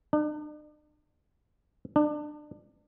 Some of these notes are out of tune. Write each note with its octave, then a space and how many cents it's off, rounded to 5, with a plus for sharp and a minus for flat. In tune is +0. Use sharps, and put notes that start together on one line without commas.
D4 +45
D4 +30